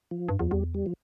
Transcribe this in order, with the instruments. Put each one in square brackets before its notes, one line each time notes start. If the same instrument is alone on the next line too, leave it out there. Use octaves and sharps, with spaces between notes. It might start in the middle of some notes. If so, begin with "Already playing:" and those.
[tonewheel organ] F3
[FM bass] G2
[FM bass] E2 [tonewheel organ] F3
[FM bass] E2 [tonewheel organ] G3
[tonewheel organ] G3
F3